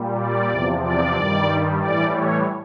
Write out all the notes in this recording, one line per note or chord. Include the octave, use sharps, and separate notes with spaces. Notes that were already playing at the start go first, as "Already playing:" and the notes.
Already playing: A#2 G3
D5
E2 C3 F3
D5
G2 D#3 G3
A2 E3 G3 D5
C#5